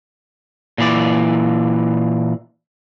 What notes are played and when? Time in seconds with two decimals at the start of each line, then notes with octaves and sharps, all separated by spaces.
0.78 A#2 E3 D5